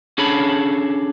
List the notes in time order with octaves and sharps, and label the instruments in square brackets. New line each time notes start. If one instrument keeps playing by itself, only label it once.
[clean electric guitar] C#4 D4 G#4 A4 C#5 B5